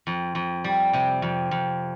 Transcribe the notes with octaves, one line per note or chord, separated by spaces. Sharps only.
F2
F2
G3
C3
F2
F2